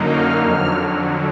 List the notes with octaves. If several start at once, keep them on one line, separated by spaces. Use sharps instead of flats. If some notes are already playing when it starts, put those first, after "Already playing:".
Already playing: F#2 D3 F#3 A#3 D#4
F6
F2 D3 F#3 F6